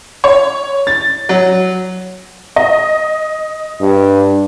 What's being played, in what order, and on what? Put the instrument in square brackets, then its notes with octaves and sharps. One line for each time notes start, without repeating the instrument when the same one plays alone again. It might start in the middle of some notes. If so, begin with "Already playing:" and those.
[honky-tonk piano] C#5
A6
F#3
D#5
[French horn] G2